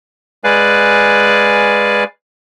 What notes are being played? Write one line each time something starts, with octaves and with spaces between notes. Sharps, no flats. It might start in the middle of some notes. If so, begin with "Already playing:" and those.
G#3 B4 D5 F5 G#5 F#6